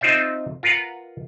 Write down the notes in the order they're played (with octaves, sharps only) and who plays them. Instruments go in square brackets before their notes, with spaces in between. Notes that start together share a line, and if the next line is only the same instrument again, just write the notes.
[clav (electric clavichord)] C4 D#4 F4 C5 D5 E5
F4 A#4 B4 F5 F#5